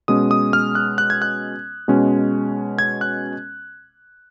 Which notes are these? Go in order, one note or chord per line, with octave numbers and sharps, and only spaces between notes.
B2 G#3 C#4 D#6
D#6
F6
F#6
F#6
G#6
F#6
B2 G#3 C#4
G#6
F#6